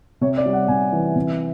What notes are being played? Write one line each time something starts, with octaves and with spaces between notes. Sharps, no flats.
C3 C#5
D5
G3
F#5
C3 G#5
E3
C3